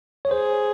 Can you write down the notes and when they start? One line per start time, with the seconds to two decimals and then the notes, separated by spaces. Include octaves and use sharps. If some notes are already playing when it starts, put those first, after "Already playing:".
0.25 C#5
0.31 G#4 C5